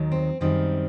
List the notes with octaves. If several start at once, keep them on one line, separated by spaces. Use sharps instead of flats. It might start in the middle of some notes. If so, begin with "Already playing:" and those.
Already playing: D#2 D#3 F#3
C4
F#2 D#3 G3 C4